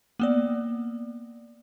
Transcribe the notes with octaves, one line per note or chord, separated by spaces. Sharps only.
A#3 B3 D5